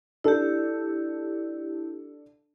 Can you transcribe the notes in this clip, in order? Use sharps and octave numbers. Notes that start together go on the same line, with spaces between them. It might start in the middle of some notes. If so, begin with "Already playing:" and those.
D4 E4 G4 A4